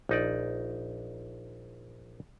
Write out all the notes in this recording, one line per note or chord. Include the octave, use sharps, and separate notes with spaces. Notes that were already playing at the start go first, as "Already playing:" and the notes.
A#1 D#4 D5